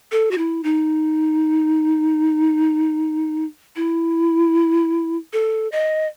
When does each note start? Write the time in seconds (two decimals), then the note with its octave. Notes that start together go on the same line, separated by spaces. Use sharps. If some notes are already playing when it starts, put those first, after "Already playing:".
0.12 A4
0.31 F#4
0.38 E4
0.64 D#4
3.76 E4
5.33 A4
5.72 D#5